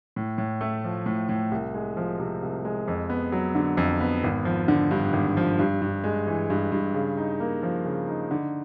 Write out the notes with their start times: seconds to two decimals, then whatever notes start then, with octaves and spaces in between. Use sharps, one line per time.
0.16 A2
0.38 A2
0.61 A3
0.84 F3
1.06 A2
1.29 A2
1.51 C2
1.74 G#3
1.97 F3
2.19 C3
2.43 C2
2.65 G#3
2.88 F2
3.10 B3
3.32 F#3
3.55 D3
3.77 F2
4.01 B3
4.24 G#1
4.45 F3
4.68 D3
4.91 G2
5.13 G#1
5.37 F3
5.59 G2
5.82 G2
6.04 G#3
6.27 E3
6.50 G2
6.72 G2
6.94 C#3
7.17 D#4
7.40 A#3
7.63 F3
7.85 C#3
8.08 D#4
8.31 D3